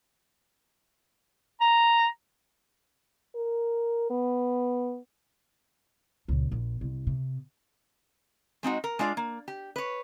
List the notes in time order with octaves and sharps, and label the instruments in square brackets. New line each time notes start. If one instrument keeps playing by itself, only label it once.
[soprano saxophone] A#5
[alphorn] A#4
B3
[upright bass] C#2 A#2
A#1
C2
C3
[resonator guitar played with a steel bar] G#3 C4 D#4 F#4
A#4
G#3 D4 F4 D5
A#3
G4
B4 C#5